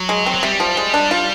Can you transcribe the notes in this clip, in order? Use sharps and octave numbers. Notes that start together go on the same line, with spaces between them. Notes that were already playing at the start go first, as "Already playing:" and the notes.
Already playing: F#3
G#3
C4
F#3
C3 G3
F3
G#3
D4
F4